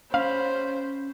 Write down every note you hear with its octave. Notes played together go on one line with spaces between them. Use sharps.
C#4 C5 F5 B5